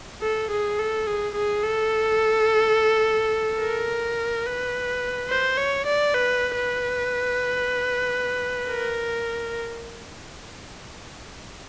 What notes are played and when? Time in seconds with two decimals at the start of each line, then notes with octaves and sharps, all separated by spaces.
0.22 A4
0.51 G#4
0.79 A4
1.07 G#4
1.35 G#4
1.63 A4
3.61 A#4
4.46 B4
5.29 C5
5.58 C#5
5.86 D5
6.14 B4
6.57 B4
8.68 A#4